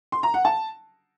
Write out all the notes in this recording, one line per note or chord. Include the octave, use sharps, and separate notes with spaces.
C6
A#5
F#5
A5